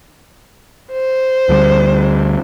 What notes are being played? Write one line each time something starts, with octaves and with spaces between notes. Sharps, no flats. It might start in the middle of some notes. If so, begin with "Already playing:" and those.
C5
D2 D3 G3